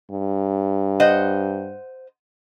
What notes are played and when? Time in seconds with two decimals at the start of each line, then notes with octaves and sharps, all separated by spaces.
0.10 G2
1.00 C5 D#5 F#5